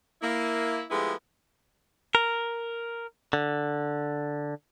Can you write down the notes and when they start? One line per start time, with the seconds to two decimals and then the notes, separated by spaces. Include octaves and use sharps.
0.22 A#3 E4
0.90 F3 G#3 A3 B3 E4 G4
2.15 A#4
3.33 D3